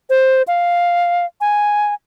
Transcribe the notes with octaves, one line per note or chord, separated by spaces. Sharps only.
C5
F5
G#5